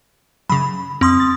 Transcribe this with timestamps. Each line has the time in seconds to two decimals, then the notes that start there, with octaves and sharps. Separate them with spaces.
0.50 F#2 C#3 B5
1.01 F2 C4 C6 D#6
1.20 A6